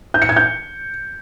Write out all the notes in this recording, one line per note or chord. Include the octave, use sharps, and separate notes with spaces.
G6
C#7
G#6
G6